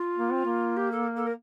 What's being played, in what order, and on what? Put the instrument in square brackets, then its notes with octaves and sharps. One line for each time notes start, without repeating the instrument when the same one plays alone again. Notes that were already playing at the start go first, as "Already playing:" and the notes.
Already playing: [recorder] F4
[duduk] A#3
C4
A#3
[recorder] G4
A4
A4
A#4